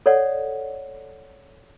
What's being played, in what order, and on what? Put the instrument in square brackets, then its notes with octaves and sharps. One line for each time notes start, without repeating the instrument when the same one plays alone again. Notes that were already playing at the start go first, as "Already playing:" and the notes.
[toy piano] A4 C#5 D5 F#5